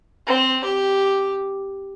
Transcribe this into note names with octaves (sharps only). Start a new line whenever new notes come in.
C4
G4